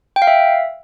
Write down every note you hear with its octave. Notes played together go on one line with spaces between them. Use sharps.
G5
F5
E5